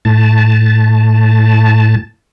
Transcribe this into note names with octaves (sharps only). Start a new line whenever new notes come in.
A2 A5